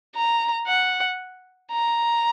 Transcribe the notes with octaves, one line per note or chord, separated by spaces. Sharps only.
A#5
F#5
A#5